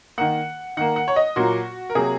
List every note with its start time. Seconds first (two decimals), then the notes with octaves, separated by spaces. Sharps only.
0.18 D#3 A#3 F#5
0.77 D#3 A#3 F#5
0.96 F#5
1.08 C#5
1.16 D#5
1.36 A#2 F#3 A#3 F#4
1.90 A#4
1.95 C3 F#3 A#3 G#4